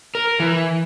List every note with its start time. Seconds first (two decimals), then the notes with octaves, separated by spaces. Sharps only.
0.15 A#4
0.40 E3